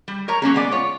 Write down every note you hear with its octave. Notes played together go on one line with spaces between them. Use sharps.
G3
A#4 C#5 A#5
F#3 A#3 C#4 G#4
G#3 B3 D5
F4 C#5